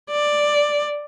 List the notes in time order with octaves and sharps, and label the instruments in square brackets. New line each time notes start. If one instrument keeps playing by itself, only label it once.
[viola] D5